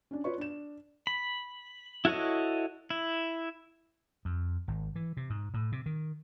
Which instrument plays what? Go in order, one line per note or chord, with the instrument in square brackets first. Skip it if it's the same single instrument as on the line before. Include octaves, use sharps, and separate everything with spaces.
[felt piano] C#4 D4
F4 B4 C#5 D5 C#6
D4 E7
[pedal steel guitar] B5
E4 F#4 A4 C#5 D#5
E4
[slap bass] F2
G#1
E3
C3
G#2
A2
C3
D#3